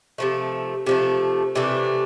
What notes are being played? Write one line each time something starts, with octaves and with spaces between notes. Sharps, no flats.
C3 F3 A3
C3 F3 A3
C3 E3 A3 D4